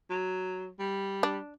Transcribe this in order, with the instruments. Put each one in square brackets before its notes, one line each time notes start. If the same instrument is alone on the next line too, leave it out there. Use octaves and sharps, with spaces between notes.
[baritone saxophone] F#3
G3
[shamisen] D4